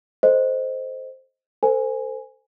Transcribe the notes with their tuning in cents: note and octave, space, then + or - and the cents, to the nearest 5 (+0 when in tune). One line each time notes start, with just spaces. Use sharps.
A4 +0 C5 +0 D#5 +0
A4 +35 C5 -20 G#5 +0